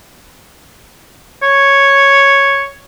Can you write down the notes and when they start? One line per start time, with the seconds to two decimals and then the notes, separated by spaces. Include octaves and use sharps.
1.43 C#5